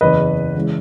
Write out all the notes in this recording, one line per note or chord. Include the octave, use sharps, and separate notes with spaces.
F#1 E2 C#3 B4 D#5
E2 C#3 E3 G#3